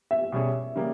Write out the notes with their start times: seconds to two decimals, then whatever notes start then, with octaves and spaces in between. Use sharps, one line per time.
0.11 E5
0.32 B2 G3 C#4 G#4 C#5
0.76 C#3 G3 A#3